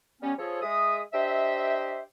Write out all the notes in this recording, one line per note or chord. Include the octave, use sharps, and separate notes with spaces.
G3 B3 C#4
F3 G#4 A4 C#5
G#3 E5 D#6
D4 G4 C5 D#5 E5